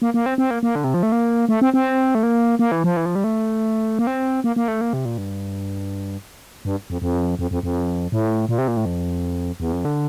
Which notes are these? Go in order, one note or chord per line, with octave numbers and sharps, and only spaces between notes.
A#3
A#3
C4
C4
A#3
A#3
D3
C3
F3
A3
A#3
A3
C4
C4
A3
A#3
A#3
E3
F3
E3
F3
G3
A3
A#3
C4
A#3
A#3
A3
A#3
C3
A#2
G2
G2
F2
F2
F2
F2
F2
A2
A#2
C3
A#2
A2
F2
E2
F2
D3